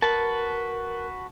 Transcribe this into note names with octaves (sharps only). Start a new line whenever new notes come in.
F#4 A#4 B4 A5